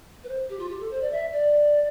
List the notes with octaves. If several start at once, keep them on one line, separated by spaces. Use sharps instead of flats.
B4
C5
G4
F4
G4
A4
C5
D5
E5
D5